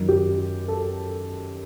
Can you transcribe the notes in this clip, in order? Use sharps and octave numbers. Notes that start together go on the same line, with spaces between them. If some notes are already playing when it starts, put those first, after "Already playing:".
Already playing: F#2 D#3 F#3
G4
A4